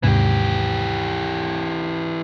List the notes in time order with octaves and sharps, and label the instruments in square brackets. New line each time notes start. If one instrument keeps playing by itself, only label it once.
[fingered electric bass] D#2 G#2 C3 [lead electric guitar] E3 G4